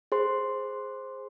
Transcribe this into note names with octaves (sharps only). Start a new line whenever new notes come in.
G#4 C5 C6